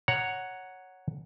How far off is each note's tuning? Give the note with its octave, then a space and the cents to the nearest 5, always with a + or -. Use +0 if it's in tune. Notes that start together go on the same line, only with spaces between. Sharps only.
C#5 +0 F#5 +0 A#5 +0